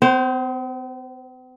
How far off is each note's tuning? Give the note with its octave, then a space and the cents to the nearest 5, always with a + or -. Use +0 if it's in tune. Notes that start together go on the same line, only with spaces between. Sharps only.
C4 -45 C5 +5